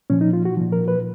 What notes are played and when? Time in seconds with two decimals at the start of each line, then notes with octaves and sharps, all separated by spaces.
0.10 A#2 F3 C#4
0.21 D#4
0.33 F4
0.45 F#4
0.57 A#2 F3
0.72 A#4
0.88 B4